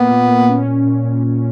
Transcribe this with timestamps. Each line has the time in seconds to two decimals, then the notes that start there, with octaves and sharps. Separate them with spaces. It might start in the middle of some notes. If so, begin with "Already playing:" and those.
Already playing: A#2 A#3 B3
0.11 A#2
0.29 A#2
0.49 C#4
0.67 A#2
0.85 A#2
1.04 A#2
1.23 C#4